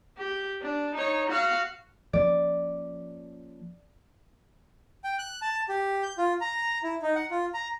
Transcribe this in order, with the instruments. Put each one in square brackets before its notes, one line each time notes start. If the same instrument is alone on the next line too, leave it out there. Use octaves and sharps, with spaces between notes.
[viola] G4
D4
D#4 C#5
F#4 F5
[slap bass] F3 A#3 C#4 [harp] D5
[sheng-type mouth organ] G5
F#6
A5
G4
G6
F4
A#5
E4
D#4
F#5
F4
A#5